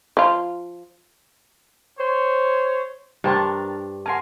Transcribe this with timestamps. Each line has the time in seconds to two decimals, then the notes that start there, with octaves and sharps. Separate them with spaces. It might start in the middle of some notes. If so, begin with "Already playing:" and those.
0.17 F3 F4
1.99 C5 C#5
3.24 G2 D4 A#4 C5 G5 A5 C6
4.06 C#4 A#4 F#5 G#5 A5 C6